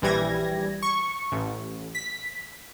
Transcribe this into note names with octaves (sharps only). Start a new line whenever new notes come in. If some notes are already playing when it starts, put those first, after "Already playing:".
A#1 E3 G3 G#6 A#6
C#6
A1
B6